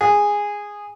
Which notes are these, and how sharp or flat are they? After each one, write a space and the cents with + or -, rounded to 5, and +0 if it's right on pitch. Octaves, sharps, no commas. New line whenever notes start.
G#4 -10